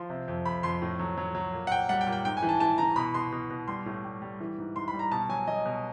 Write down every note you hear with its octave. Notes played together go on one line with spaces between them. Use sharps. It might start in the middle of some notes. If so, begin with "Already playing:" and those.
Already playing: F3 C6
C3
F2
F2 B5
F2 C6
A2
F#3
F#3
F#3
A#2
F#5
A#2 G5
G3 F#5
G5
A#2
G5
G#2 G5
G#5
E3
A5
E3 A5
E3 A#5
B2 B5
B2 C6
B2
B2
G3 C6
A2
G3
G3
E3
G#2
G#2 C6
B5
G3
A#5
B2 A5
F#3 G#5
F#3 D#5
B2